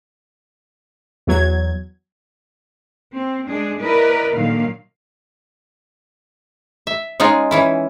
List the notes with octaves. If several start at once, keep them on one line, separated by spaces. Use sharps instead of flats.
E2 F#3 G#6
C4
G#3 D4 G#4
E4 A#4 B4 D5 D#5
A#2 D3 D#3 F#3 A#3 F5
E5
G#3 C#4 D#4 F4
E3 C#4 E4